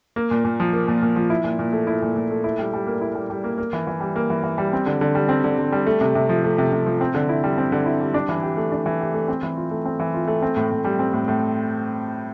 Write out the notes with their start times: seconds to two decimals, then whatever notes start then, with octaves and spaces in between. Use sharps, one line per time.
0.16 A#3
0.31 A#2
0.45 A#2
0.60 F3
0.73 A#3
0.88 A#2
1.02 A#2
1.16 F3
1.30 E4
1.44 A#2
1.59 A#2
1.73 A3
1.87 E4
2.02 A#2
2.16 A#2
2.31 A3
2.44 E4
2.59 G3
2.73 G3
2.87 A#3
3.01 E4
3.15 G3
3.30 G3
3.44 A#3
3.58 A#3
3.73 E3
3.87 E3
4.00 G3
4.16 A#3
4.30 E3
4.43 E3
4.58 G3
4.73 C4
4.86 D3
5.01 D3
5.15 G3
5.29 C4
5.44 D3
5.58 D3
5.72 G3
5.86 A3
6.01 C3
6.15 C3
6.29 F3
6.44 A3
6.58 C3
6.72 C3
6.86 F3
7.01 C4
7.15 D3
7.29 E4
7.44 G3
7.58 C4
7.72 D3
7.86 E4
8.01 G3
8.14 D4
8.29 E3
8.43 G4
8.57 A3
8.72 D4
8.86 E3
9.00 G4
9.14 A3
9.28 C4
9.43 E3
9.57 F4
9.71 A3
9.85 C4
9.99 E3
10.14 F4
10.27 A3
10.42 C4
10.57 A2
10.71 A2
10.84 G3
10.99 C4
11.13 A2
11.28 A2